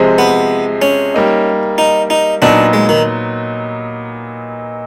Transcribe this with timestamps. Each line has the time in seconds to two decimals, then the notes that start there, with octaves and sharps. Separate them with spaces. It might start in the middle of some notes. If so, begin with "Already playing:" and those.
Already playing: C3 F3 G#3
0.18 B3
0.82 C#4
1.14 G3 A#3 D#4
1.78 D#4
2.10 D#4
2.42 A#2 F#3 B3 D4 D#4
2.73 G#3
2.89 D#3